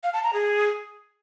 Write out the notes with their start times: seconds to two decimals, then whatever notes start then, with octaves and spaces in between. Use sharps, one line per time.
0.03 F5
0.13 A5
0.23 A#5
0.33 G#4